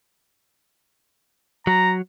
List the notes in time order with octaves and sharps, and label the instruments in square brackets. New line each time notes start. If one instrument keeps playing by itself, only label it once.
[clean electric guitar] F#3 [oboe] A#5